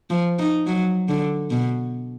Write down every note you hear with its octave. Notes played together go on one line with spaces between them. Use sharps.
F3
D#4
F#3
D3
B2